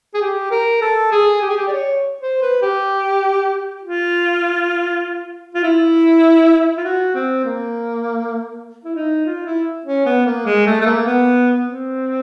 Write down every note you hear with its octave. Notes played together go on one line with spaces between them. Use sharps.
G#4
G4
A#4
A4
G#4
G4
G#4
G4
D5
C#5
C5
B4
G4
F4
F4
E4
F4
F#4
C4
A#3
E4
D#4
F4
E4
C#4
B3
A#3
G#3
A3
A3
A#3
B3
C4